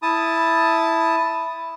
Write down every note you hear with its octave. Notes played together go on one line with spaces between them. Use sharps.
E4 A5 D#6